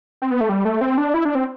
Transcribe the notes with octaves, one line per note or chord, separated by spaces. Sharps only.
C4
B3
A3
G3
A3
C4
D4
E4
D4
C4